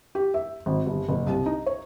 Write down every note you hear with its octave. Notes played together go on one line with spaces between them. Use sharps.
G4
E5
G#1
G1
F#1
C2
D#4
C#5